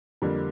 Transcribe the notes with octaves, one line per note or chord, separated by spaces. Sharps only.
F2 D3 G3 A#3